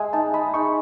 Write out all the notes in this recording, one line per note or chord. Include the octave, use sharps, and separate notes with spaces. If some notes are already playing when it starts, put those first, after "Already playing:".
Already playing: G#3 E5 G#5
D#4 A5
G#3 B5
D#4 C#6